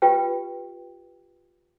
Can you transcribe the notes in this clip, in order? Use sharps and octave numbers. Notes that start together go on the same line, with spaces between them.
F4 G4 B4 G5